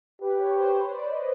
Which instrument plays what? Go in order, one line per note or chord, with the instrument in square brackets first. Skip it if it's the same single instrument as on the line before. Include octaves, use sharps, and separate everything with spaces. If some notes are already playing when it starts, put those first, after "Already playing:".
[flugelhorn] G4 [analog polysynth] B4
[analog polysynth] C#5
C5
C#5
D5
D#5